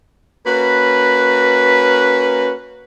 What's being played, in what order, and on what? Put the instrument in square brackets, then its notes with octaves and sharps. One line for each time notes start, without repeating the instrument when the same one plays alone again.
[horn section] A#3 C#4 F#4 B4